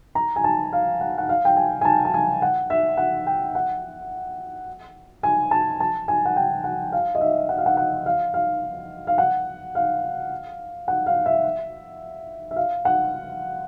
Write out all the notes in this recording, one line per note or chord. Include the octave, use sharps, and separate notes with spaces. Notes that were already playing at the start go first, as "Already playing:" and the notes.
A#5
G#5
A5
F5
F#5
F#5
F5
G5
G#5
G#5
A5
A5
G#5
F#5
E5
F#5
G5
F#5
G#5
A5
A5
G#5
F#5
G5
F#5
F5
D#5
E5
F#5
F5
F#5
F#5
F5
F5
F5
F#5
F5
F#5
F5
E5
E5
F5
F#5